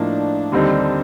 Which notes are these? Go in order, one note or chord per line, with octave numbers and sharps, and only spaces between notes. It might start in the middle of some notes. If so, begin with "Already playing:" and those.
Already playing: A2 F3 A#3 D4 D#4
D#2 D3 G3 C4 D#4